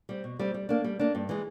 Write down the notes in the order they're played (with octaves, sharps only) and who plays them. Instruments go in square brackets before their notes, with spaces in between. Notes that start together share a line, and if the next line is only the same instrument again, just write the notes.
[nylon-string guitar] G3 C4
B2
G3 C4
G3
A#3 D4
G3
A#3 D4
G2
E3 G#3